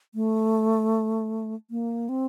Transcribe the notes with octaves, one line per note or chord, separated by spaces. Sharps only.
A3
A#3
C4